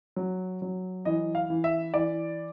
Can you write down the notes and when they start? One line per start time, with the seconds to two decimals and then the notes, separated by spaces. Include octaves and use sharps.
0.16 F#3
0.62 F#3
1.05 E3 D#5
1.35 F5
1.50 E3
1.64 E5
1.94 E3 D5